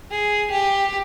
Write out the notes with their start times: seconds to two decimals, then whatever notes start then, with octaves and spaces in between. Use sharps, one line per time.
0.11 G#4
0.51 G4